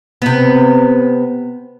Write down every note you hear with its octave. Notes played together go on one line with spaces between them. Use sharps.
C3 B3